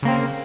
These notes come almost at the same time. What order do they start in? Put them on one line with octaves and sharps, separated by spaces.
C#3 A#3 C4